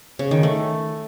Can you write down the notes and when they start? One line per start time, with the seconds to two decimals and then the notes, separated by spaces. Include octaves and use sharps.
0.19 C#3
0.31 D#3
0.43 A3